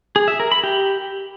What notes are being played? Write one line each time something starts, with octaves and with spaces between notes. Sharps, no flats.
G#4
E5
A#4
B5
G4